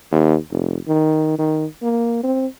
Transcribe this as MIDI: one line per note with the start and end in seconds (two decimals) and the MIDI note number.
0.12 0.36 39
0.51 0.78 29
0.88 1.37 51
1.39 1.65 51
1.82 2.21 58
2.23 2.46 60